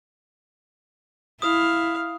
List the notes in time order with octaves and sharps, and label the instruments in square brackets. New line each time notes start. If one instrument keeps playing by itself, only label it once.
[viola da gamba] E4 [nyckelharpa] F5 [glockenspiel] D#6